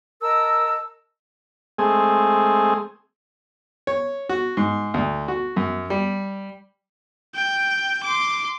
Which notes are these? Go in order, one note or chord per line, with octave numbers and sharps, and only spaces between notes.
A#4 D#5 A5 E6
G#3 A3 C4 G#4
C#5
F#4
G#2
D2
F#4
F#2
G3
G5
C6 D6